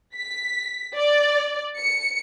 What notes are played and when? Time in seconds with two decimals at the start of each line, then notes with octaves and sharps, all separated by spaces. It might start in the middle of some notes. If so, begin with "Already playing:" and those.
0.16 B6
0.96 D5
1.78 C#7